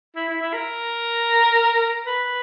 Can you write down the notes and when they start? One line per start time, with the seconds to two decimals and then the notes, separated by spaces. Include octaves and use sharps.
0.16 E4
0.28 E4
0.41 E4
0.53 A#4
2.06 B4